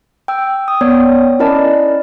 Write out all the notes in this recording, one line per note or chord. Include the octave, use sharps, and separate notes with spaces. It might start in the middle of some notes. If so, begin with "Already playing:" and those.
G5 E6
D#6
B3 C#5 D5 G5
C#4 E4 A#4 D5 D#5 A5